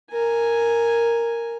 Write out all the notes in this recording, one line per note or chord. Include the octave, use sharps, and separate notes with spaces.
A#4 G#5